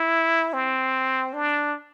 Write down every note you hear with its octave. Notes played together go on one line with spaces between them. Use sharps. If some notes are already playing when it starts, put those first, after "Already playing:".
Already playing: E4
C4
D4